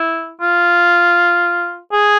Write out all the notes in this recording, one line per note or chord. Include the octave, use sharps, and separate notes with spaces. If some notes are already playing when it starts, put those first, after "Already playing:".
Already playing: E4
F4
G#4